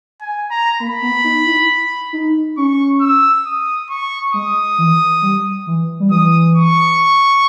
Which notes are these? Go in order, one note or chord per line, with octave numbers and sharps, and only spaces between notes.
G#5
A#5
A#3 B5
B3
D#4
E4
D#4
C#4 C#6
E6
D#6
C#6
G#3 D#6
E3
G3
E3
G3
E3 D#6
C#6